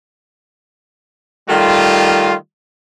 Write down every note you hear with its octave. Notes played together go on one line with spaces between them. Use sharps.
D#3 G3 A3 F4